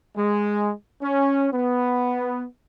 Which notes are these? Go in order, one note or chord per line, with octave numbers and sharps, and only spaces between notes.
G#3
C#4
B3